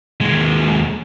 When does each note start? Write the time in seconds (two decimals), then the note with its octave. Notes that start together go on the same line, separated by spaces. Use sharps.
0.21 D#2 G#3